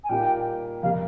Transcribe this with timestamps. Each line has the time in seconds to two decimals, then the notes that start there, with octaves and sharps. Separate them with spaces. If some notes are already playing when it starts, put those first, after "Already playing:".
0.04 G#5
0.09 A#2 G3 A#3 D#4 G4 G5
0.83 F2 C3 G3 A#3 F5